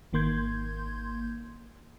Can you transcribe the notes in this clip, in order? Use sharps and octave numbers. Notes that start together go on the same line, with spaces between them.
G#1 D#3 A#3 C6 G6 G#6